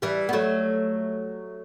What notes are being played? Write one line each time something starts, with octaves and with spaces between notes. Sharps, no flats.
E3 G3
B3
F#3 A3